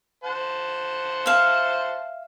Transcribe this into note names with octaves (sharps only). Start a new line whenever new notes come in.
C5 F#5 A5
E5 F5